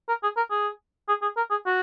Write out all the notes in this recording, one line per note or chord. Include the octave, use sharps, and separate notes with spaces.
A#4
G#4
A#4
G#4
G#4
G#4
A#4
G#4
F#4